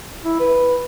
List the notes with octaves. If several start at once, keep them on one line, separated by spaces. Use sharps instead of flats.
E4
B4